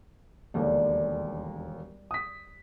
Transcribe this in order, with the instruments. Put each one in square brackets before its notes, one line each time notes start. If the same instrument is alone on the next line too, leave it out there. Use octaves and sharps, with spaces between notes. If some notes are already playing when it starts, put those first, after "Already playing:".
[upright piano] E1 D#2 D3 [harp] G3
[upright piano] D#6 B6